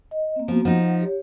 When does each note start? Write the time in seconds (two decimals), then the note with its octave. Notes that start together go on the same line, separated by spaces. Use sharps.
0.11 D#5
0.36 A#3 C4
0.48 F3 A#3 B3 F#4
0.65 F3 D#4 F#5
1.01 G4 C#5